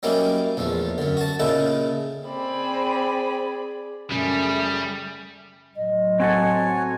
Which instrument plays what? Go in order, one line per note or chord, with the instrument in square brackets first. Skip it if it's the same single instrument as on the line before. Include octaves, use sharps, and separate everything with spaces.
[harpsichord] F#3 G3 A#3 C#4 D#4 E4
A#1 E2 F3 A3
F#2 D3
F#4 A5
A#2 C#3 D#4 E4 A4
[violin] C4 B5 [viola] G#4 D5
[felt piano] F#2 C#3 [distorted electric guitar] G3 [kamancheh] A3 G#4
[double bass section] A2 F#3 [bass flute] D#5
[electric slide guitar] C4 F#4 A4 [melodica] C#5 G#5